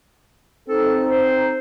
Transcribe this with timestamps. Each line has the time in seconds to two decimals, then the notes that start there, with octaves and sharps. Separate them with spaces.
0.68 C4 D#4 A4
1.09 C5